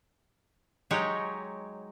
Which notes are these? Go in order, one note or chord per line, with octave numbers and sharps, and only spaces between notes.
F#3 G#3 D#4 G4 C#5